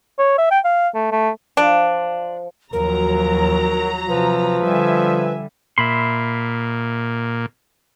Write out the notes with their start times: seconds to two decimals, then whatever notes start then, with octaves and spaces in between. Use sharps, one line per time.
0.19 C#5
0.38 E5
0.51 G5
0.64 F5
0.95 A3
1.12 A3
1.57 F3 D4
2.73 D#2 F3 F#3 A#4 A#5
4.09 C3 F3 B4
4.64 D3 G3 E5 G#5
5.78 A#2 E5 B5 C6